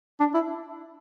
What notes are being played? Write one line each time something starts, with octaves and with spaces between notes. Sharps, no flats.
D4
E4